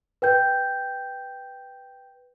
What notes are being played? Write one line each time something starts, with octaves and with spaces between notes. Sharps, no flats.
B4 G5 G6